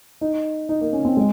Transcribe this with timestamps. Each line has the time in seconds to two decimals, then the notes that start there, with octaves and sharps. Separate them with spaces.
0.21 D#4
0.69 D#4
0.81 A#3
0.93 C#4
1.05 C4
1.17 G#3